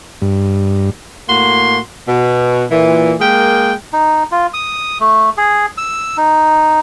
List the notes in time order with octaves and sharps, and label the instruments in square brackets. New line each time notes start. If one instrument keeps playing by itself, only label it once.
[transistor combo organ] G2
[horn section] A2 A#3 F#4 C6
B2
A#2 E3
G#3 A#3 G#4 A#4 G5
[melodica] D#4
F4
D#6
A3
G#4
E6
D#4